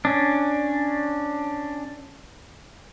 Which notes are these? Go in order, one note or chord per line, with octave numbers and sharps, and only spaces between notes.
C#4 D4